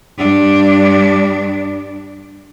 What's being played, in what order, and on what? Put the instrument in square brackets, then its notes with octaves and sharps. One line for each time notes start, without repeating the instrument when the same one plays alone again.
[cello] G2 D4